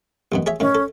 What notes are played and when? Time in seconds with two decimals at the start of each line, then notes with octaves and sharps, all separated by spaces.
0.32 A1 F#2 B2
0.46 G#4 C#5 E5
0.60 A2 D#3 C#4
0.75 A4